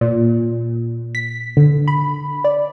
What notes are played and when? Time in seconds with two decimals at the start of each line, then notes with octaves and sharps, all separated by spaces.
0.01 A#2
1.15 B6
1.57 D3
1.88 B5
2.44 D5